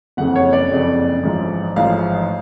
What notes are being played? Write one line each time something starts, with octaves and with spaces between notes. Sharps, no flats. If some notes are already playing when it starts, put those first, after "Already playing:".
F#1 F2 C#3 F#5
C#5
D5
F#1 F2 C#3
A1 G#2 F3
A1 G#2 F3 F5